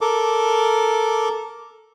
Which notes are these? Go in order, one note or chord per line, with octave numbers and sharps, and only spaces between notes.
A4 A#4 D6